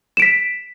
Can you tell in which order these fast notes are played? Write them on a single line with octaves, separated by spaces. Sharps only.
E7 D7 B6